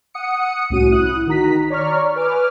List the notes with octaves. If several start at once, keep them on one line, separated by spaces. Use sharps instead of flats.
F#5 D#6 C#7
C2 A2 C#4 F#4 D#7
E4 D#6 F#6
D#3 F#4 A#5 B6
C#5 D5 A#5 C#6 F6
B4 G#5 D6 F6